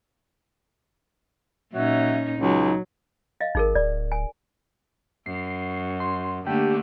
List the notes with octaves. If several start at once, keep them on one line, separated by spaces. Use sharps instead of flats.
A#2 F#3 C#4 D#4 E5
C#2 F#3 D#4
D#5 F5
G#1 D#4 G#4 A#4
D1 D5
G#5
F#2 C7
C6
D3 A3 A#3 G4